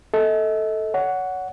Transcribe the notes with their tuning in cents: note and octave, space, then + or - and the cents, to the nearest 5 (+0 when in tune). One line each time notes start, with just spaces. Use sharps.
A4 +0 D#5 +40
C#5 +25 F#5 +0